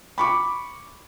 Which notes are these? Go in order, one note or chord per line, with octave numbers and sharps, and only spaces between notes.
B5 C#6 D6